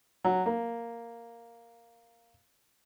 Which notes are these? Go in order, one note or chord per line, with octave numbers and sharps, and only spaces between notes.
F#3
A#3